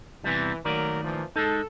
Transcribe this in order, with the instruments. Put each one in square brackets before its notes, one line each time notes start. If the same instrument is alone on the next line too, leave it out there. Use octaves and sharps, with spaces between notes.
[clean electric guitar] E2 C3 G3 [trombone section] E3
[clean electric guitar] D#3 A3 D5 [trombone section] F#3 A#3 A#4
[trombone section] A#2 E3 F3
[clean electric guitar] G#3 D#4 [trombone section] A4